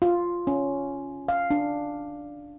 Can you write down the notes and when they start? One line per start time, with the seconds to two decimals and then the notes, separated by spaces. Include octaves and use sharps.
0.02 F4
0.47 C#4
1.28 F5
1.51 D4